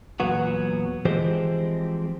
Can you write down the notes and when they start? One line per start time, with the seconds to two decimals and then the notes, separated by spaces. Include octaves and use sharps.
0.20 E2 A#2 F#3 B3 F#4
1.05 E3 F3 G#3 C4 G4 C5